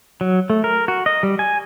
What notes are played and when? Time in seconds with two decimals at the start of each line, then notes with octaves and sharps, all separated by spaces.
0.21 F#3
0.50 A3
0.64 A#4
0.88 F#4
1.06 D#5
1.23 G3
1.39 G#5